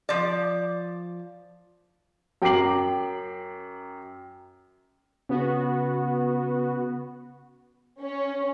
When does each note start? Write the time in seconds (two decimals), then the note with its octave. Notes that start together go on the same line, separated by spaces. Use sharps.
0.09 F3 D5
2.42 F#2 G5 A#5 D6 C7 F#7
5.29 C#3 B3 F#4
8.01 C#4